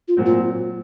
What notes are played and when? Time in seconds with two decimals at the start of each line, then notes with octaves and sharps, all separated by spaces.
0.08 F4
0.17 A#2 F#3 C4
0.26 F4